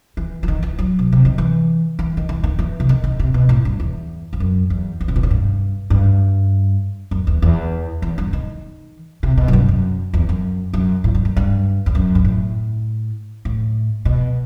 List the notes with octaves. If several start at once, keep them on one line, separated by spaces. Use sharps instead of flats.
E3
E3
D#3
E3
F#3
B2
C3
D#3
E3
E3
D#3
E3
D#3
E3
C3
D#3
D#3
C3
B2
A2
G2
E2
E2
F#2
E2
E2
C3
B2
A2
G2
G2
F#2
E2
E2
E2
G2
D#3
C3
B2
F#2
G2
F#2
E2
F#2
F#2
A2
G2
F#2
G2
E2
F#2
G2
A2
A2
B2